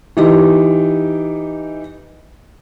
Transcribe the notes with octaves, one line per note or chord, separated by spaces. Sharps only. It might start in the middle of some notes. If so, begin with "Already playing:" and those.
E3 D#4 G4